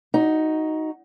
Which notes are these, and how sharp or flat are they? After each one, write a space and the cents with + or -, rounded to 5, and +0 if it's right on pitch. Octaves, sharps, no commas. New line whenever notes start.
D#4 +5 F#4 +0